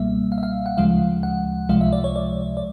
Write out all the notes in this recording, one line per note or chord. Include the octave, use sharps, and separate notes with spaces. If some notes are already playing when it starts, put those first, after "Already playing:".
Already playing: C#2 B2 G3 A#3 E5
F5
E5
F5
F#5
D2 C#3 F3 G#3 F5
F#5
C#2 C3 F3 G#3 F5
E5
D5
C#5
D5
D5